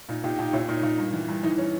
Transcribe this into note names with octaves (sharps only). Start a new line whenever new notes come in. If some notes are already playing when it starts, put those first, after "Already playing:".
A#2 D#4
A#2 D#4 G4
A#2 D#4 G4
A#2 C#4 E4
A#2 D#4
A#2 D#4
G2
E3
G2
E3 D#4
C#4